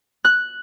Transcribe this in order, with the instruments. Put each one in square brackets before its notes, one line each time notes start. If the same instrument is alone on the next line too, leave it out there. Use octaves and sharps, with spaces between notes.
[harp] F#6